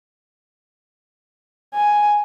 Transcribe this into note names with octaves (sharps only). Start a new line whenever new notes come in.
G#5